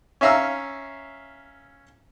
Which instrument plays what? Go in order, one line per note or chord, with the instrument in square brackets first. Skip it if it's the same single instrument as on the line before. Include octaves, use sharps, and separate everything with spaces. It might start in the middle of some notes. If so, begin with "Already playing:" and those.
[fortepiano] C#4 E5 F5 A#5 E6